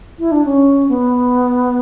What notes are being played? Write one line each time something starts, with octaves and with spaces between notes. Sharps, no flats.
E4
D4
C#4
B3